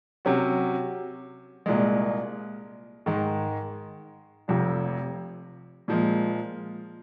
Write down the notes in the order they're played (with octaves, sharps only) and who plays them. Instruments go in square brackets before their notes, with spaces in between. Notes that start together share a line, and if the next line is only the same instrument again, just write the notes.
[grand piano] C3 F#3 C#4 F#4
C2 A#2 G#3
G#2 D#3 G#3
F1 F2 C3
A#2 F3 G#3